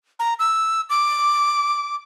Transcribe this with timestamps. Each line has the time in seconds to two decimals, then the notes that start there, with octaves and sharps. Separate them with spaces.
0.19 A#5
0.39 E6
0.90 D6